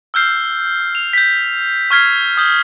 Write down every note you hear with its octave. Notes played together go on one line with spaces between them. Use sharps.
E6 F6 G6 C7
F7
G6 B6
C#6 F6 G#6 B6 C7
D#6 G6 G7